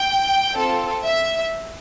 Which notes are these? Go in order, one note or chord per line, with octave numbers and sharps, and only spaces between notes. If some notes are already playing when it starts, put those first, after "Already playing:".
Already playing: G5
C4 F4 A4
E5